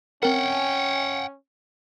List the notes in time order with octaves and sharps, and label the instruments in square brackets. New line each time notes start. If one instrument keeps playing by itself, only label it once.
[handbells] C4 A#4 [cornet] C#4 [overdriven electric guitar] F#5 G5